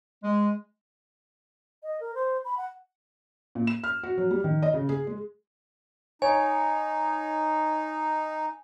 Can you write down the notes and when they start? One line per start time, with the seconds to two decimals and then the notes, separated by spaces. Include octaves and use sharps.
0.24 G#3
1.83 D#5
2.00 A#4
2.15 C5
2.45 B5
2.57 F#5
3.55 A#2
3.67 E7
3.84 F6
4.03 F#4
4.18 F#3
4.31 G3
4.44 D#3
4.63 D#5
4.74 C#3
4.89 G#4
5.07 G#3
6.22 D#4 C#5 G#5